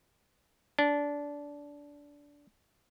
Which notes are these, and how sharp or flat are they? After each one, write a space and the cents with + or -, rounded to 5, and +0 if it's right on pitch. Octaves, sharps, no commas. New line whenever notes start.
D4 -20